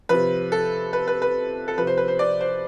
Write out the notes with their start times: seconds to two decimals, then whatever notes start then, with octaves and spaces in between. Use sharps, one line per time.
0.09 C3 F3 B4
0.52 A4
0.93 B4
1.08 B4
1.22 B4
1.68 A4
1.77 C3 F3 B4
1.87 C5
1.98 B4
2.08 C5
2.19 D5
2.41 C5